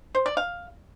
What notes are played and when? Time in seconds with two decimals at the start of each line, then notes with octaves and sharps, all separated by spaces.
0.15 C5
0.26 D5
0.37 F5